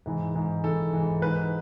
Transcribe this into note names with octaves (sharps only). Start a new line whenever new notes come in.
G#2 E3
G#2 E3
G#2 E3 A4
G#2 E3
G#2 E3 B4